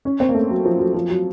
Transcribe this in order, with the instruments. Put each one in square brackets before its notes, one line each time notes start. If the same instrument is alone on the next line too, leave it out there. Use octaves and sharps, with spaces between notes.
[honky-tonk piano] C#4
C4
A#3
A3
F#3
F3
F#3
F3
F#3